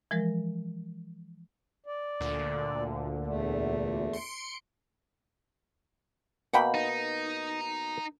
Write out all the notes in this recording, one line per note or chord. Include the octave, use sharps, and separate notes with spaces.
E3 F3 G#3 A#4
D5
D2 A#2 D3
E2 A3
C6 C#7 D7
B2 A#3 F#5 G5 B5
D#4